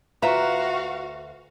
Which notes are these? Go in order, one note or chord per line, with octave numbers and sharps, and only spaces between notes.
D2 F4 F#4 B4 E5 F5 A#5